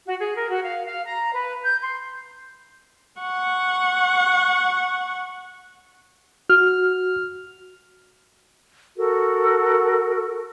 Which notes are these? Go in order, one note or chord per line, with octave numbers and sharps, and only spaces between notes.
F#4
G#4
A#4
F#4
F5
F5
A#5
B4
G6
C6
F#5 C#6
F#4 F6
F#4 A4 A#4